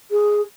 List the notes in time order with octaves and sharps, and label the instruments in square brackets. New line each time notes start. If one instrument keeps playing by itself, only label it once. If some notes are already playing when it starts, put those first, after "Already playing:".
[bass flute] G#4